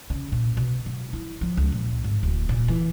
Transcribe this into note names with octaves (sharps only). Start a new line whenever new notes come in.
C#3
A#2
B2
F#3
E4
F3
C#2
A#2
G#1
D1
A#2
E3